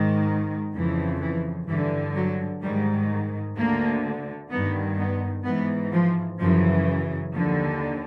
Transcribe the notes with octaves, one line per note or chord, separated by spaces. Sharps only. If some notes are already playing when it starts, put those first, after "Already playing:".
Already playing: G#2 D#3
F2 C#3 E3
E3
G2 D3 E3
F#3
G#2 D#3 G3
D2 D3 A#3
G2 D#3 B3
B3
G#2 E3 B3
F3
F#2 C#3 E3 F3
D#2 D3 F3